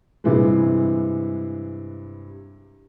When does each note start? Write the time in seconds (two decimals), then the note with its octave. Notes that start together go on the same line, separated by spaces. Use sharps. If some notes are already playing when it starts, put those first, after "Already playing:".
0.24 G2 C3 E3 G#3